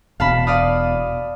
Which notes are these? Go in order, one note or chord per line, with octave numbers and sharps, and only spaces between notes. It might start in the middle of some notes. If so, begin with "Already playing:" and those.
E1 B2 F5 A5 B5
D5 F5 D#6